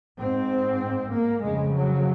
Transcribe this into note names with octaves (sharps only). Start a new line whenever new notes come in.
G#2 C4
A#3
F2 C#3 G#3
F#3